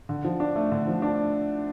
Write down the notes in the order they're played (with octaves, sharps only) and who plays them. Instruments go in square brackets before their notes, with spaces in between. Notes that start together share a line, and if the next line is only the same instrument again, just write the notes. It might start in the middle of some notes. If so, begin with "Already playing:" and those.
[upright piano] D3
F3
D4
A3
D3
F3
D4